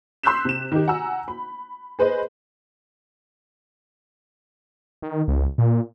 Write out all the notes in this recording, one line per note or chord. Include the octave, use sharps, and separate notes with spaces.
C6 E6 F#6 G6 B6 E7
C3 E7
D#3 G4
F#5 G#5 A#5 E6
B5
G#4 B4 C5 D#5
D#3
C#2
A#2